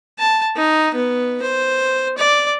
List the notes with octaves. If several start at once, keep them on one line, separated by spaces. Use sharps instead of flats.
A5
D#4
B3
C5
D5